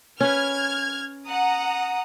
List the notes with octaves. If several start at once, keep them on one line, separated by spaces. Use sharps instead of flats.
C#4 B4 F6 G#6
F#5 A#5 D#6